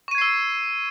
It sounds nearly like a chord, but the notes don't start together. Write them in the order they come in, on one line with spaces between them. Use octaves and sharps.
C#6 D#7 G#6 C7 E6